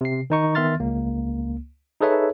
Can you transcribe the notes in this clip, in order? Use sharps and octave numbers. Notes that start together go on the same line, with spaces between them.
C3 C7
D#3 D#4 C#6
D#3 B3 E5 C6 F6 A6
C#2 A#3
D#4 G#4 A4 B4 C#5 E5